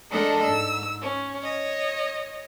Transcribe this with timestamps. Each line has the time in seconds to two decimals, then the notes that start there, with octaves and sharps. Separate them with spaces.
0.11 G#3 D4 A4 A#4 D#5 F#5
0.42 G#2 E6
1.01 C#4
1.42 C#5 D#5